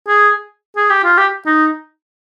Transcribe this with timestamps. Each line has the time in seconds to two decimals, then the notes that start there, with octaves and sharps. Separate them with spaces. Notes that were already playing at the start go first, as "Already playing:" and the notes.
0.08 G#4
0.77 G#4
0.90 G4
1.04 F4
1.18 G4
1.46 D#4